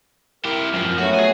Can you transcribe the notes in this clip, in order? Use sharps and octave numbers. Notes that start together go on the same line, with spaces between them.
E4 G4 A#4
F#2 F3
F#3 A3 B3 F#4
G#4 G#5